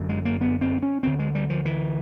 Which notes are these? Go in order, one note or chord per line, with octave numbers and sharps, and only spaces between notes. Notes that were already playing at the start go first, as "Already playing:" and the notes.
Already playing: G1 F#2 D3
G#3
A#3
B3
C4
C#4
D2 D3 C4
G#3
G3
F3
E3